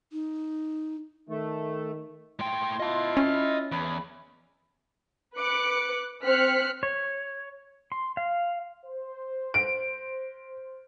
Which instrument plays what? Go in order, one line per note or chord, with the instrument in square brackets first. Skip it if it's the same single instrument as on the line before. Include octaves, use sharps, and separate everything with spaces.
[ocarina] D#4
[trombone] D#3 [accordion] A3
[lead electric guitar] A2 G5 [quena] C6
[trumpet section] E4 F4 [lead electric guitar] D#5 A5
[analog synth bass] C#4
[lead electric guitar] E2 [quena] B5
[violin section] B4 D6 F#6 C#7
C4 C5 F6 F#6 B6 C#7
[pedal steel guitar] C#5
C6
F5
[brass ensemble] C5
[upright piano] D7